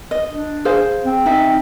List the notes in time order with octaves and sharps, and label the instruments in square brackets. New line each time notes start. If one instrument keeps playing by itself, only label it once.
[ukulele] D#5
[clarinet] D4
[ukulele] G#4 C5 F5
[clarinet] C4
[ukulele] D#4 E5